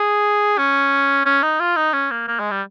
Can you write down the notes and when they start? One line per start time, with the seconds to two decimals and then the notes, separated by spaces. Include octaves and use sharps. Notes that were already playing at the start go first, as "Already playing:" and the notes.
Already playing: G#4
0.58 C#4
1.26 C#4
1.43 D#4
1.60 F4
1.77 D#4
1.94 C#4
2.11 A#3
2.28 A#3
2.40 G#3
2.51 G3